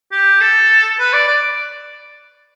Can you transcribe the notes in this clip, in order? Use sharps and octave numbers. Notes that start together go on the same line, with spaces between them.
G4
A4
B4
D5
D5